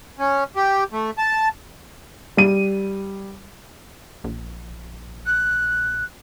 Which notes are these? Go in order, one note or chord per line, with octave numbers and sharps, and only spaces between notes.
C#4
G4
A3
A5
G3 D#7
A#1
F#6